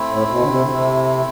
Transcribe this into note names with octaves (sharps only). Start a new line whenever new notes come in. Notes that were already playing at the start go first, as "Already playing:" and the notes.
Already playing: A3 C4 E4
A2
B2
D3
C3
D3
C3